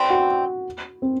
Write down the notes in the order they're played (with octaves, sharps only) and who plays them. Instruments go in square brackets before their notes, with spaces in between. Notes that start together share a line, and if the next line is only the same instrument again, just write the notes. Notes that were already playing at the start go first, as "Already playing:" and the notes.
Already playing: [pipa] E3 G3 C4
[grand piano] F#4
C4